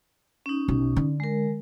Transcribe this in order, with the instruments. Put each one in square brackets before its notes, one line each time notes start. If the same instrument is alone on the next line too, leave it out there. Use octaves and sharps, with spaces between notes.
[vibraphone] C#4 D#4
[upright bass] B1
D3
[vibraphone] G#3 A#4